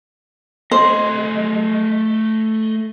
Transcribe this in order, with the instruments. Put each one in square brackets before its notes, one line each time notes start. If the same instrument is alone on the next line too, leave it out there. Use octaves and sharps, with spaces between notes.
[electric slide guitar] A3 D#5 [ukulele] C5